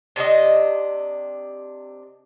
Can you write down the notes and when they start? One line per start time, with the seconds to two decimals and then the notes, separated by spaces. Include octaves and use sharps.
0.16 C3 D4 G4 D#5